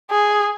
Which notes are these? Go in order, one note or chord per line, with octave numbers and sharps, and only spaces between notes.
G#4